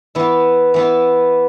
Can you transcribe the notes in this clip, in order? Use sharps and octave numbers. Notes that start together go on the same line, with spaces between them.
E3 B3 E4
E3 B3 E4